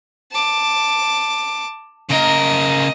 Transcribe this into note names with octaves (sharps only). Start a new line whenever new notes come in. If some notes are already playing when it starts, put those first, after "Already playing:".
A5 D6
C#3 A#4 D#5